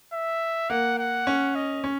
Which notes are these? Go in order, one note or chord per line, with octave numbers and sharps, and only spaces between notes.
E5
A#3 F#5
F#5
C#4
D#5
C#4